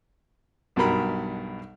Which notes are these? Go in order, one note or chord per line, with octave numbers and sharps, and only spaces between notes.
B1 G2 B2 A#4 B5